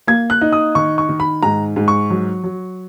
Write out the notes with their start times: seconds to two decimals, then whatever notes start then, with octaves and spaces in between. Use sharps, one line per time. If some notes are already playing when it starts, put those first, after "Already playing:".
0.07 A#3 G#6
0.30 F#6
0.41 D#4
0.53 D#6
0.75 D#3 C#6
0.98 C#6
1.09 D#3
1.20 B5
1.43 G#2 A#5
1.76 G#2
1.88 C#6
2.10 F#3
2.44 F#3